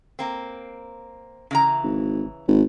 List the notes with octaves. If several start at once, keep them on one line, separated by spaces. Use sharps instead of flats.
A#3 C4
C#3 E3 A#5
G#1
G#1